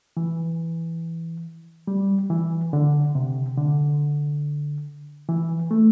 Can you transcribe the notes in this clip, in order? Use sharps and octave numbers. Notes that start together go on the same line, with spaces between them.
E3
G3
E3
D3
C3
D3
E3
A3